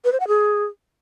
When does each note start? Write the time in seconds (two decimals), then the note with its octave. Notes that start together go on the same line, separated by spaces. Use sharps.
0.05 B4
0.12 C5
0.20 F#5
0.28 G#4